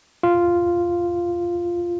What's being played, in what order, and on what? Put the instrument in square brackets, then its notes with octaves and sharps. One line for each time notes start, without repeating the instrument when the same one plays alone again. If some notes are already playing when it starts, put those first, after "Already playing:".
[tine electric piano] F4